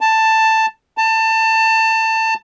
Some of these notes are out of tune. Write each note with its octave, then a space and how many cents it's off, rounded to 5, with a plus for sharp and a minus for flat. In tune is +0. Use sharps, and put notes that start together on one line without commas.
A5 +10
A5 +25